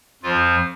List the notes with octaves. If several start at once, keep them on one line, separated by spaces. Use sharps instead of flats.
F2 F3 F4